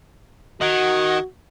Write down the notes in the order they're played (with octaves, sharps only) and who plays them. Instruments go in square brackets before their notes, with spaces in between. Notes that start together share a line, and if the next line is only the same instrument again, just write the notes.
[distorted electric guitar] D#3 [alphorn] F#4 [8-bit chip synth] D#5 F#5 G#6